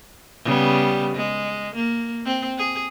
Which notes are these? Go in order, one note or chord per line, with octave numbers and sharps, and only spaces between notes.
C#3 G3 B3
G#3
A#3
C4
G#4